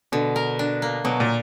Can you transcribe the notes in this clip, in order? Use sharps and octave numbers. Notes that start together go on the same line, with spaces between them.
B2 D3
A#4
D4
A#3
B2 F#3
A#2